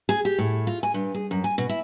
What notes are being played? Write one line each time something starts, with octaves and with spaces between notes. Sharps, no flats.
G#4
G4
A2
F4
G#5
G2
G#4
F#2
G#5
B2
E4